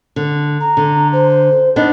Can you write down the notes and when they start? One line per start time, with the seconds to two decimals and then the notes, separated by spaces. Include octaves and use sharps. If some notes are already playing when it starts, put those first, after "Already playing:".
0.16 D3
0.61 A#5
0.77 D3
1.13 C5
1.76 B3 D4 D#4 D#5